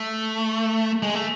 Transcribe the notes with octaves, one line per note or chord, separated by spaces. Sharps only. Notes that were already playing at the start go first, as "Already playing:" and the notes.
Already playing: A3
G#3
A3